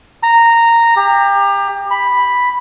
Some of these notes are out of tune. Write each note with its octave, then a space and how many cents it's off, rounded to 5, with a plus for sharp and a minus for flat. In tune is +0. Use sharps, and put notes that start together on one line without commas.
A#5 -10
G4 +30
B5 +0